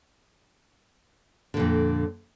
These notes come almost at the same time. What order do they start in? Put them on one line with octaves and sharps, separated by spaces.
D3 A#2 F2